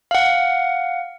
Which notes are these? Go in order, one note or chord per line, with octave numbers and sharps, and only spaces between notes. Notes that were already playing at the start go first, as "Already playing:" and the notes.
F5 F#5